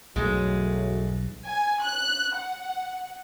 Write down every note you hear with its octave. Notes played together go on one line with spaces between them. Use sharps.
B1 E2 G2 F#3 G#3 A3
G#5
F#6
F#5